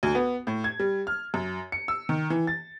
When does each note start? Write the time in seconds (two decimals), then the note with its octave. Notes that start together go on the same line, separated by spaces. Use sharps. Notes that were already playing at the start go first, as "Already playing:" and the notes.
0.03 D2
0.15 B3
0.47 A2
0.64 G#6
0.80 G3
1.07 F6
1.34 F#2
1.72 C#7
1.88 E6
2.09 D#3
2.30 E3
2.47 A6